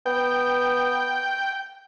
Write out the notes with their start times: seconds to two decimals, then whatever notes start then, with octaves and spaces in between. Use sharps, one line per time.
0.06 B3 G5